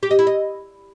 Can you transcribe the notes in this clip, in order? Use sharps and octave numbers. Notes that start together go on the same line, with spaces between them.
G4
D#5
E4
D#5